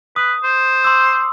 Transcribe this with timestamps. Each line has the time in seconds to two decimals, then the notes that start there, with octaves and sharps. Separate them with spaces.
0.16 B4 D#6
0.44 C5
0.84 C6 D6 E6